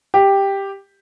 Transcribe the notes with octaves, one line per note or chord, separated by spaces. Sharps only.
G4